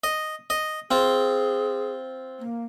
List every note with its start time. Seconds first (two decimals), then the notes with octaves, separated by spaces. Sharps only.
0.04 D#5
0.50 D#5
0.91 C4 F4 G#4
2.40 A#3